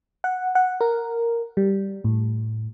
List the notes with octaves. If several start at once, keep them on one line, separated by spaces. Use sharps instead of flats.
F#5
F#5
A#4
G3
A2